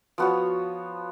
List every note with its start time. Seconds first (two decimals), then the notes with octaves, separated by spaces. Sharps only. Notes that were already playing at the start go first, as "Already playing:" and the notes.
0.18 F3 B3 F#4 C#5